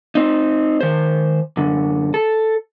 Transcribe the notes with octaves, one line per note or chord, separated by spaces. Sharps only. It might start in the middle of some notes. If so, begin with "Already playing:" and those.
C4 D#4
D#3 C5
F#2 D3
A4